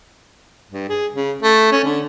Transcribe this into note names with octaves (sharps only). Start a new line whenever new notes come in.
G2
G#4
C#3
A3
C#4
D3